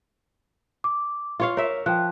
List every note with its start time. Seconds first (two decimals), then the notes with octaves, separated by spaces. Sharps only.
0.84 D6
1.40 F4 C#5 F5
1.57 A#4 C#5 E5
1.86 F3 G5 F#6